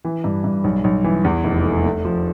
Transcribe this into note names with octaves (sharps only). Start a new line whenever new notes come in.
E3
G2
G2
B1
B1
E3
E2
F1
A3
A3
F3